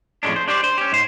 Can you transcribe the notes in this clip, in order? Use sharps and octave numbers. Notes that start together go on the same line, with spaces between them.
F2 A2 C#3 G#3 C#4 D4
C5
D4 G4 C5 D5
C5
C#4 G4
G#2 C5